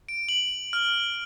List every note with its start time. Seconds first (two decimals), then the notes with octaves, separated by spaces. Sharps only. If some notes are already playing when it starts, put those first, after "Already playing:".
0.09 D7
0.29 F#7
0.73 F6